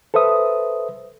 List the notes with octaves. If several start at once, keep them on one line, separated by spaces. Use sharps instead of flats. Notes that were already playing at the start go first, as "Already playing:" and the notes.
A4 B4 C5 E5 D#6